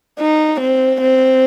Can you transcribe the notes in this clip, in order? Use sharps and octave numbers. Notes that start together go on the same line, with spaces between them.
D#4
C4
C4